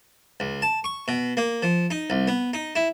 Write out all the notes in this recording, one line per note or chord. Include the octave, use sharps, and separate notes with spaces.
C#2
A5
C#6
B2
A#3
F3
D#4
C2
B3
D#4
E4